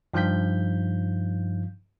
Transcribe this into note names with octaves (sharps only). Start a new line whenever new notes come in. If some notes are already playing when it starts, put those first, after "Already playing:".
G2 F3 D#4 F5 G6 B6